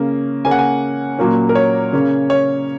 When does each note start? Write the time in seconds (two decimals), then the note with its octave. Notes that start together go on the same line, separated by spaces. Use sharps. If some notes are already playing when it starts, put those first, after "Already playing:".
Already playing: C#3 A#3 C#4
0.45 C#3 A#3 C#4 G#5
0.51 F#5
0.59 G#5
1.19 A#2 F#3 A#3 C#4
1.49 A#4
1.55 C#5
1.93 C#3 A#3 C#4
2.30 C#5